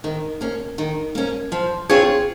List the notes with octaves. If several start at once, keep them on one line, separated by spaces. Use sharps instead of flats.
D#3
A#3 C#4
D#3
A#3 C#4
F3
C4 F4 G#4 C#5